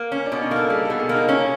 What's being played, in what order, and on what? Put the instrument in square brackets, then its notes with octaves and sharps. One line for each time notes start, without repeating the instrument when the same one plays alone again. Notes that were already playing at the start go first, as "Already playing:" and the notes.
Already playing: [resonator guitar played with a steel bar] A#3
C#4
[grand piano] D4
[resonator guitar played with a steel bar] B2
[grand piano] D#4
[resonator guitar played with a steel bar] A#3 [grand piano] A4
[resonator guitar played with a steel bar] G3 [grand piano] G#4
[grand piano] A4
[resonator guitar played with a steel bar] B2
[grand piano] G#4
[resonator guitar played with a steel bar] A#3
[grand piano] D#4
[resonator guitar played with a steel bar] C#4 [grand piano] E4